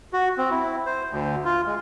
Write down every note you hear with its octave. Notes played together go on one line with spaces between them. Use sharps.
F#4
C4
E4
C5
D2
F4
G#3